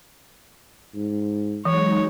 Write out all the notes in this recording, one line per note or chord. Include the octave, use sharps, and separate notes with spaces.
G#2
E3 F#3 G#3 D#4 C#5